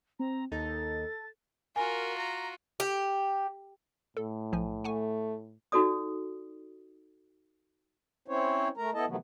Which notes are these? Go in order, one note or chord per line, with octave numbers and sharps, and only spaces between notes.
C4 A#5
D#2 D#4 A4 A6
F4 F#4 A#4 G#5
A#5
G4
A2 A4
B1 F3 G#5
A3 F#5 G#5 C#6
D#4 F#4 A4 D5 D#6
C4 C#4 E4 C5 C#5
A3 A#4 A#5
B3 E4 A4 D#5 A5
C3 D#3 E3 F#3 A3 B3